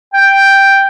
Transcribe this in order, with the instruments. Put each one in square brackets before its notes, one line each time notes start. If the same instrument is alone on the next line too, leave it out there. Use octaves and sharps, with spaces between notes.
[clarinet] G5